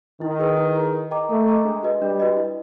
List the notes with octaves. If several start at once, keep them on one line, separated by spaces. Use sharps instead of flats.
D#3 E4
G#4 B4
E4
G#4 B4
A#4
D#5 G5 A#5 D6
A3 A#4
D#5 G5 A#5 D6
G#3 D4
F#4 B4 D#5
G3 D4
F#4 B4 D#5
E4